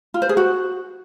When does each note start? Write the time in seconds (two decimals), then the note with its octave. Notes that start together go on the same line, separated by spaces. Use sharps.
0.14 F4
0.22 C5
0.29 G#4
0.37 F#4